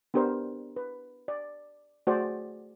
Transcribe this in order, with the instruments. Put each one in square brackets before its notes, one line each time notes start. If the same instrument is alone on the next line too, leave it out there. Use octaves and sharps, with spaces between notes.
[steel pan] B3 D4 G4 A#4 C5
B4
D5
A3 F#4 G#4 C5 D5